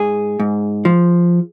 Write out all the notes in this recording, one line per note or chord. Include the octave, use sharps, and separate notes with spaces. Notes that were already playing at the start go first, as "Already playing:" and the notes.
Already playing: G#2 G#4
G#2
F3